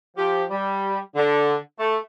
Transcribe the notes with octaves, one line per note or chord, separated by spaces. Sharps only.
F3 G4
G3
D3
A3